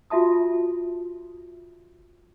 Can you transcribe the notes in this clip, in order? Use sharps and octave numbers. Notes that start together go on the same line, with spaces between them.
F4 F#4 E5 A5 D#6